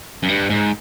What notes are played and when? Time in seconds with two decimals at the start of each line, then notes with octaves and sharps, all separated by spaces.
0.23 F#2
0.29 G2
0.50 G#2